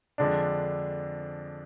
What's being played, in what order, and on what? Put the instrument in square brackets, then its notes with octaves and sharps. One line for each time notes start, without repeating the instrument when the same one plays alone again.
[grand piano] F2 D3 G#3 D4